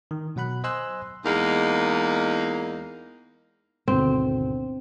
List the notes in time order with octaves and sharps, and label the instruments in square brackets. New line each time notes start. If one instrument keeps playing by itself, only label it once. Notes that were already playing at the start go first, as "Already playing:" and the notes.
[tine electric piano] D#3
B2 F#3 F#5 B5 F#6
C5 D#5 G#5 C6 E6 F#6
[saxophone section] E2 G#3 A#3 D#4
[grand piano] G#1 D2 B2 [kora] C4